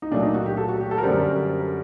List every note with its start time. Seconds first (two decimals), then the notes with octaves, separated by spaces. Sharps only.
0.02 D#4
0.11 A#2 F#3 A3 D4
0.23 D#4
0.34 F#4
0.46 G4
0.57 A4
0.68 F#4
0.80 G4
0.91 A4
0.98 A#4
1.03 F#2 D3 G3 C5